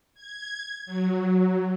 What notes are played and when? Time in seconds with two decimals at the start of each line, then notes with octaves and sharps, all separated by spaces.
0.15 G#6
0.86 F#3